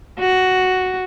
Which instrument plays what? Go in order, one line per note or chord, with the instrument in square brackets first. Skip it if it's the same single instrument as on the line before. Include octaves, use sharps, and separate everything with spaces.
[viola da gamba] F#4